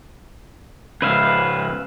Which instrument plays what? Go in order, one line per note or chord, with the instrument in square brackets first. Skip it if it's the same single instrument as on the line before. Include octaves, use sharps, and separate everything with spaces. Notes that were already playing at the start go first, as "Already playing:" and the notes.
[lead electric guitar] G#2 C#3 [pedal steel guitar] B4 E5 F5